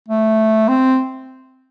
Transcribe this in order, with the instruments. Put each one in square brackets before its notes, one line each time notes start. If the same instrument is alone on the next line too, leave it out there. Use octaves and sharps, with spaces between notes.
[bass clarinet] A3
C4